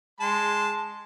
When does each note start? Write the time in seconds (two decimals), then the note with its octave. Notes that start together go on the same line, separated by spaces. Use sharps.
0.20 G#3 A5 C6